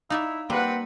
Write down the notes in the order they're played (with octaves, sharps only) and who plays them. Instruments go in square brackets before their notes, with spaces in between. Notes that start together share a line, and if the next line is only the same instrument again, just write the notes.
[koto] D#4 D5 E5 [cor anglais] E4 [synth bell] F5
[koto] G3 [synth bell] A#3 [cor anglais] C4 [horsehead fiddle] B4 F#5